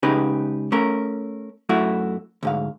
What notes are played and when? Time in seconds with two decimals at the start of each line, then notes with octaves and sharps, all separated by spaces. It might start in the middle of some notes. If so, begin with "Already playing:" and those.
0.03 C#2 C#3 D#4 G4 G#4 B4
0.72 A3 C#4 A#4
1.69 F#2 A3 E4 F#4
2.43 D2 G#2 F5